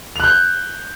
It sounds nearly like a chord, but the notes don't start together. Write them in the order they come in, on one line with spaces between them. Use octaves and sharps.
F7 F#6 G6